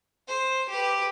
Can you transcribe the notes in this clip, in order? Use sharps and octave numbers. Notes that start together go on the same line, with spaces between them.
C5
G4 B4